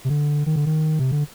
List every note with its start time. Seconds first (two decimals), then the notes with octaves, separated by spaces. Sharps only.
0.05 C3
0.09 D3
0.46 D#3
0.56 D3
0.66 D#3
0.99 C3
1.12 D3